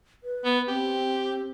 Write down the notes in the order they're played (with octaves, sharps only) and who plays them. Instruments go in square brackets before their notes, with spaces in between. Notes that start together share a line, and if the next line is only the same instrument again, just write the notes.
[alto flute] B4
[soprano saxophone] B3
[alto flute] C4 [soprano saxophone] G4